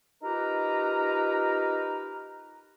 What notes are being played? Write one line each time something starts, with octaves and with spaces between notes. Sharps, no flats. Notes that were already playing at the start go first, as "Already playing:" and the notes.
D#4 F4 G4 A#4 B4 A#5